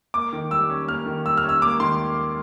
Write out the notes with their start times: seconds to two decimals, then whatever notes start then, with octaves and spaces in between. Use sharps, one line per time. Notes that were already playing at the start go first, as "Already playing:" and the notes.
0.14 A#3 D6
0.33 D#3
0.51 G3 E6
0.70 C#4
0.88 A#3 F6
1.06 D#3
1.25 G3 E6
1.37 F6
1.44 C#4
1.49 E6
1.62 A#3 D6
1.80 D#3 C6